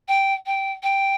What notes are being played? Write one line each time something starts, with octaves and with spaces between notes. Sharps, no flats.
G5
G5
G5